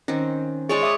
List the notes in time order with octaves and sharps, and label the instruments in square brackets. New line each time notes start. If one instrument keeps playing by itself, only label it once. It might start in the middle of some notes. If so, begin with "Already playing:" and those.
[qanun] D#3 C4 [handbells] C#4
[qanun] G#3 D5 C#6 [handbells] G#4 G#5 [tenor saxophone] C#5
[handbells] E5 D6 D#6